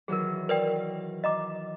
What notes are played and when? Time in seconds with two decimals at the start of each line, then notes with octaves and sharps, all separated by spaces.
0.08 D#3 E3 F#3 G#4 A#4
0.49 A#4 B4 D5 G5
1.24 D#5 A#5 D6